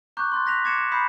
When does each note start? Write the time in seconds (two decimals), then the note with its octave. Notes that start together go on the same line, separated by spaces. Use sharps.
0.17 A#5 C#6 D6 F#6 G6
0.32 C6 F#6 A6
0.46 F#6 A#6 B6 F7
0.64 D6 G#6 A6 C7 C#7 E7
0.78 E7
0.91 A#5 B5 D#6 G6 B6 C7